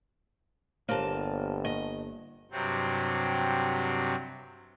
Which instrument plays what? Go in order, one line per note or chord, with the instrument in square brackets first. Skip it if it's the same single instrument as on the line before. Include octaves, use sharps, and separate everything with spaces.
[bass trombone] G1 [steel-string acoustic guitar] A#3 A5 [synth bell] G4 C5 C#5
[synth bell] A#3 [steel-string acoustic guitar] D#5
[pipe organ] G2 C3 F#3 C4